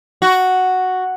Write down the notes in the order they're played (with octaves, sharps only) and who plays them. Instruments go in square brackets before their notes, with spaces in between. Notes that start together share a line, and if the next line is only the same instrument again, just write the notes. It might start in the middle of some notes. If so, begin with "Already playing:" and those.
[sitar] F#4